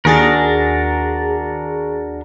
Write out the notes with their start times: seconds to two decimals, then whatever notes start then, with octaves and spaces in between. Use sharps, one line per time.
0.05 D#2 D4 F#4 G#4 A#4 A6